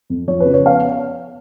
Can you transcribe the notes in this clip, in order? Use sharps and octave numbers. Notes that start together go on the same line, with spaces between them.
F2
F3 C#5
C#3 B4
C#5
B3 F5